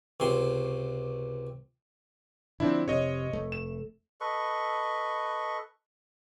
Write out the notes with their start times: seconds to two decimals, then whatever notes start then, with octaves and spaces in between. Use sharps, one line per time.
0.20 C#2 C3 C6
2.60 D3 F3 C4 D4 E4
2.88 F1 C3 C#5 D#5
3.33 F1 A3
3.52 E7
4.21 A4 B4 D#5 C#6